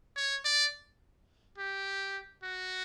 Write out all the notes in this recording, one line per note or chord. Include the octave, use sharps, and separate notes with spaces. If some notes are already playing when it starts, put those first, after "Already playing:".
C#5
D5
G4
F#4